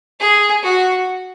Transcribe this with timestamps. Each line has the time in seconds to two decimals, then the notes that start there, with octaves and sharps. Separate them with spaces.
0.20 G#4
0.63 F#4